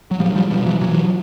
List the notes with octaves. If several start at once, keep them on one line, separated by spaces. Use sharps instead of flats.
F#3
A2 F3 G3
F3 G3
B2 F3 G3
E3 F#3
B2 E3 F#3